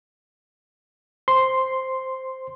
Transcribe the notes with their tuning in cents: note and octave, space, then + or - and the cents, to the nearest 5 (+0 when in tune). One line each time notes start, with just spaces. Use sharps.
C5 +0 C6 +0